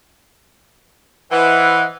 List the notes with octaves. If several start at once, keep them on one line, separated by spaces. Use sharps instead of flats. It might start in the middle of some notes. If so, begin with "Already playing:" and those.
E3 C5 D#5 F#5